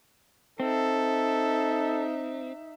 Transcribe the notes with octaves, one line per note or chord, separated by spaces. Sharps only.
C4 D#4 A4 E5